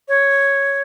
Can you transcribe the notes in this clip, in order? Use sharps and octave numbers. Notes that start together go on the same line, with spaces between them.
C#5